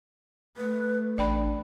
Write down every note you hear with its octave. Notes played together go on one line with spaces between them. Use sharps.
A3 B4
A1 D4 D5 G5 B5